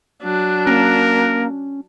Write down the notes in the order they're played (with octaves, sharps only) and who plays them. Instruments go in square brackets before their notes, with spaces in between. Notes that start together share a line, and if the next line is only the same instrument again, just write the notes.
[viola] F#3 D4
[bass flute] A#3 [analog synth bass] C#4 [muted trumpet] A#4